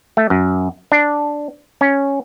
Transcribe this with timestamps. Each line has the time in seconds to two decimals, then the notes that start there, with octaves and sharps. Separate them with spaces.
0.17 A3
0.30 F#2
0.92 D4
1.81 C#4